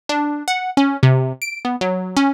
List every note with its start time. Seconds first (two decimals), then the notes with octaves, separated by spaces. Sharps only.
0.09 D4
0.48 F#5
0.77 C#4
1.03 C3
1.42 D7
1.65 B3
1.81 F#3
2.17 C#4